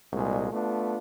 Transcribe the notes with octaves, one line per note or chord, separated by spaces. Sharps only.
C2 A#2 G#3
A3 B3 D4 F4